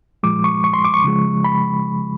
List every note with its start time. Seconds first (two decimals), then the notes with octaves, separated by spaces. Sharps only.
0.23 A#2 F3 G#3 D6
0.44 C#6
0.64 C#6
0.73 C6
0.84 D6
0.94 C#6
1.04 C#3 F3 G#3
1.44 B5